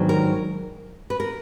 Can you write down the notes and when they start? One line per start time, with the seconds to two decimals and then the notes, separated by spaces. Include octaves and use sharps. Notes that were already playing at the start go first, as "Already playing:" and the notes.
Already playing: G#2 D#3 F#3 B3 D4
0.09 A#4
1.10 B4
1.20 A#4